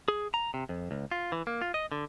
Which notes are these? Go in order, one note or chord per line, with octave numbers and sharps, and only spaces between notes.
G#4
A#5
C3
F2
C#2
F4
E3
A#3
F4
D#5
D3